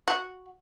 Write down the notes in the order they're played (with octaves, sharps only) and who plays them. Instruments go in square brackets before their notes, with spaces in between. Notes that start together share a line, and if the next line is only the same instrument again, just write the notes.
[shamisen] F#4